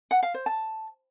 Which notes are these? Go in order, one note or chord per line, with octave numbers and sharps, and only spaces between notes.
F#5
F5
C5
A5